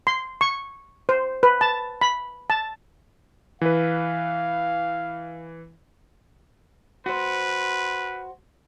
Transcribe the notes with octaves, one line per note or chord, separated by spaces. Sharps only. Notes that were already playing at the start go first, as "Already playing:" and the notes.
C6
C#6
C5
B4
A5
B5
A5
E3 B4 F5
F#4 B4 C5